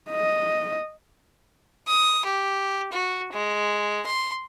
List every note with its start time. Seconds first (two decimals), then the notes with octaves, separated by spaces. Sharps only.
0.11 D#5
1.87 D#6
2.25 G4
2.92 F#4
3.32 G#3
4.06 C6